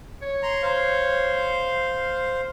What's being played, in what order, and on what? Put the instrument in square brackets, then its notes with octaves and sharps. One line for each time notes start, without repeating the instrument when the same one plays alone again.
[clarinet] C#5
[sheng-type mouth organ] A#5 C6
C5 F5